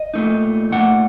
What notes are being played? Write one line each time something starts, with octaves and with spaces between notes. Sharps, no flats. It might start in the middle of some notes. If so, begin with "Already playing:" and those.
Already playing: D#5
A#2 A3 D#4
A#2 A3 D#4 F#5